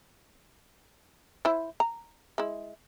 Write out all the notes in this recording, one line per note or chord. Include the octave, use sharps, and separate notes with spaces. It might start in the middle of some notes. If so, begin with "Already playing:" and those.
E4 C5
A#5
G#3 E4